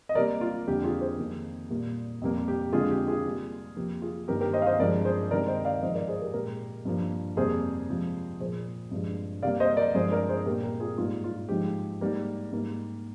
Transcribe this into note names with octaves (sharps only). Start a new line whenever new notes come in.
D#5
C3 G3 A#3 A#4 D5
F4
F2 D3 G3 A#3 G4
F4 G#4
G#4 C5
F2 D#3 A#3
A#2 G3 A#3
F2 C3 G3 A#3
G4
F2 D3 G#3 F4 G#4
G4
F4 G#4
C3 G3 A#3
F2 C3 F3 A#3 G4
F4 G#4
G2 D#3 A#3 G4 A#4
G4 A#4
C5 D#5
F5
C5 D#5
G2 F3 G#3 A#4 D5
G#4 C5
C3 D#3 G#3 A#4 D5
C5 D#5
D5 F5
G#2 F3 G#3 C5 D#5
A#4 D5
G#4 C5
G4 A#4
A#2 G#3 G4 A#4
G2 F3 A#3
F2 C3 G3 A#3 G#4 C5
C3 F3 G#3
A#2 F3 A#3 G#4 C5
G2 F3 G#3
C3 G3 A#3 D5 F5
C5 D#5
A#4 D5
G2 F3 G#3 G#4 C5
A#4 D5
G#4 C5
A#2 G3 A#3 G4 A#4
G4 A#4
F4 G#4
G#2 G3 A#3 F4
F4
G#2 F3 G#3 G4
G#2 G3 A#3
G#2 G3 A#3